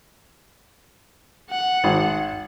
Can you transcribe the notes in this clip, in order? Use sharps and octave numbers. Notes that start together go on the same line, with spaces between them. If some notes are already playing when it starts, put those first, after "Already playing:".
F#5
G#1